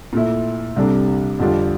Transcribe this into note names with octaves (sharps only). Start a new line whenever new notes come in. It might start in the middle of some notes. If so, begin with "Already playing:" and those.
A#2 A3 E4
C2 C3 G3 D4 A4
F2 D3 G3 D4 F4